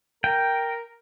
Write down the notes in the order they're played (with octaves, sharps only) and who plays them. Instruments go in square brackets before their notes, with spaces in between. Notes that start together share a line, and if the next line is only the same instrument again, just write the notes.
[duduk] A#4 [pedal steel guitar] G5